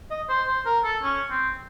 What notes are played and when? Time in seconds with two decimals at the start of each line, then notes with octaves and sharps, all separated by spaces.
0.11 D#5
0.29 C5
0.47 C5
0.66 A#4
0.84 A4
1.03 C#4
1.30 C4